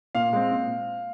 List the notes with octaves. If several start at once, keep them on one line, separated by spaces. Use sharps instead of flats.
A#2 F5
G#3 C4
A#2